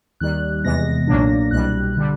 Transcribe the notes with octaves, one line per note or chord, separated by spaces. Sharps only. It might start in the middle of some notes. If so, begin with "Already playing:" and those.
D#2 D#3 G3 F#6
E2 C3 E3 G#3 B3 A#6
B1 A#2 F#3 A#3 D4
C2 B2 G3 F#6
D3 G3